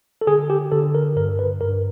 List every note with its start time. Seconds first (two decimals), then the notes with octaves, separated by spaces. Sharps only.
0.21 A4
0.27 D3 G#4
0.50 G4
0.72 D3 A4
0.95 A#4
1.16 G2 A#4
1.39 B4
1.61 G2 A#4